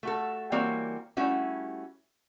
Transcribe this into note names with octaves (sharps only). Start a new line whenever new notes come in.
A3 F#4 A4
E3 G3 A#3 C4 F#4 C#5
G3 A3 C#4 E4 F#4